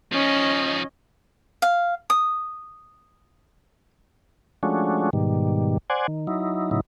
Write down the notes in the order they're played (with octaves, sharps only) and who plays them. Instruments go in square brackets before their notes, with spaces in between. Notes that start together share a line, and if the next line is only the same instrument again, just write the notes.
[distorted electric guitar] F3 D#4 [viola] C#4 D#5
[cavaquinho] F5
D#6
[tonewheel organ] F3 G#3 A3 C#4 D4 F#4
G#2 B2 D#3 G3
C5 D5 F#5 G#5
D#3
F#3 D#4 E4
A2 C#3 F#3 D#4 E4